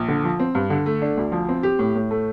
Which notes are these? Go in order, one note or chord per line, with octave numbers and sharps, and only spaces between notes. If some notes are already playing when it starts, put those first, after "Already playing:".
Already playing: A#1
D3
F3
C4
G2
D3
A3
D4
D2
F3
C4
G4
A2
A2
A3